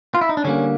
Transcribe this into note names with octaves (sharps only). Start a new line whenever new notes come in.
F4
E4
D#4
D4
D3 G3 A#3 C#4